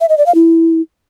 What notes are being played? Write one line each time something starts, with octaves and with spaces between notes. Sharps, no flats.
E5
D#5
D5
F5
E4